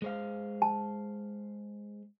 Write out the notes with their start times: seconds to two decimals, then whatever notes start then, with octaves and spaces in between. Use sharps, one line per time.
0.02 G#3 C5 F5
0.62 A5